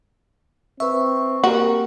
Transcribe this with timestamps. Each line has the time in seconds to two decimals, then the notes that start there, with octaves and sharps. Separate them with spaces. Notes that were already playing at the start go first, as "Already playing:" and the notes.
0.80 C4 B4 E5 C#6
1.44 A#3 F#4 G4 A#4